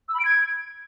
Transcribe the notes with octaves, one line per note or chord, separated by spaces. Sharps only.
E6
B5
D7
G#6